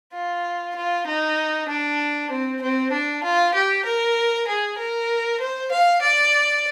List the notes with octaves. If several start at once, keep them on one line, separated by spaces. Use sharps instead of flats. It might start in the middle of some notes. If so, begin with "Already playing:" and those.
F4
F4
D#4
D4
C4
C4
D4
F4
G4
A#4
G#4
A#4
C5
F5
D5